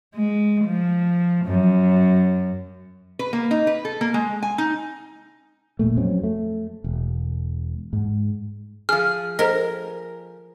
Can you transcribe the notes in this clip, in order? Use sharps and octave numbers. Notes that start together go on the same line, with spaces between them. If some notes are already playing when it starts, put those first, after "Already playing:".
G#3
F3
F#2
B4
A#3
D#4
B4
A4
A#3
G#3
G#5
D#4
F1 A#2 A3
F2 F#3 C4 C#4
A3
E1
G#2
F3 G#4 F6
A4 A#4 C5 D#5